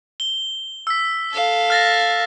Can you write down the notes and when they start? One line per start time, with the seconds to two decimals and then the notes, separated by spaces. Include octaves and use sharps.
0.20 G7
0.87 E6 B6
1.33 A4 F5
1.70 F6 A6 A#6